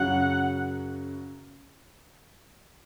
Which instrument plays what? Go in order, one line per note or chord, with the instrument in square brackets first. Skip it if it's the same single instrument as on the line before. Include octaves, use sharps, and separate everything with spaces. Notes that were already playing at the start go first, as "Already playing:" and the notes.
Already playing: [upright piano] F#2 C#3 F#3 [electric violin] F#5